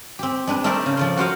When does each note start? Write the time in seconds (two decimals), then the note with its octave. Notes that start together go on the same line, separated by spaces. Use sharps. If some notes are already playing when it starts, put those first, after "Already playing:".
0.19 C4 G4
0.47 G#3 D4 B4
0.64 A3 D#4 A#4 C5 D5 E5
0.86 C#3
0.97 F3 D5 C6
1.17 F#4 A#4 C5 D#5 F5 F#5